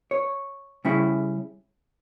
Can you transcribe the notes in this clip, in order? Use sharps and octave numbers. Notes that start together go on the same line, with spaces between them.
C#5
C#3 G3 C#4 E4